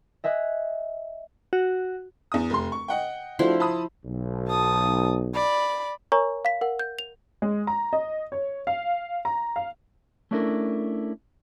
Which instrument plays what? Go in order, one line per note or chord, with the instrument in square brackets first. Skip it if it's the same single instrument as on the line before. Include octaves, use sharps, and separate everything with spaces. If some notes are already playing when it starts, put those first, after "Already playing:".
[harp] D#5 E5 G#5 F#6
[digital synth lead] F#4
[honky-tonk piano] E2 D#6
F1 C6
C#6
D#5 F#5 G5
[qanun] F3 E4 C6 [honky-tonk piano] A3 D4 F#4
[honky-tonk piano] A5 B5 D#6
[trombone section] B1
[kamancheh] A5 D#6
D5 B5
[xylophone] A#4 C#5 G#5 A#5 C#6
F5 B6
A#4 F#5
G6
F7
[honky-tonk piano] G#3
A#5
D#5
C#5
F5
A#5
F5
[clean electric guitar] A3 C#4 D4 E4 A4 A#4